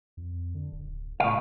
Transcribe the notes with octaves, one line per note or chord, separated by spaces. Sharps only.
F2
D3
D1
A2 C#3 F5